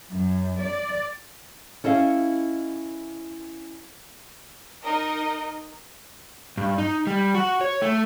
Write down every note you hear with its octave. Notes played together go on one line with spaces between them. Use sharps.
F#2
D5
C#4 E4 A4 D#5 F5
D#4 A#4 D#5
G2
D#4
G3
F#4
C#5
A3